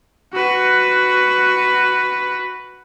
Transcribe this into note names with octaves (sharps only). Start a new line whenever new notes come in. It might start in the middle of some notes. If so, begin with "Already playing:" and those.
F#4 B4